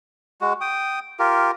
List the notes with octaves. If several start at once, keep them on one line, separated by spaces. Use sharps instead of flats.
G#3 F#4
G5 D#6
F4 G4 A#4